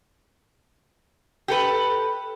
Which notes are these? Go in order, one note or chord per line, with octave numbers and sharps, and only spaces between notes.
G4 A4 B4